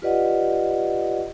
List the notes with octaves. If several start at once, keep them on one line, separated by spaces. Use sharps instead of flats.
F4 G4 B4 D5 D#5 F#5